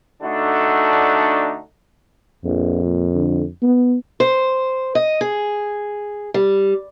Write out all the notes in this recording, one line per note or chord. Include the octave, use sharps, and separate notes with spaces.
D3 A3 D4 D#4 F#4 A4
A#1 F2
A#2
D3
B3
C5
D#5
G#4
G3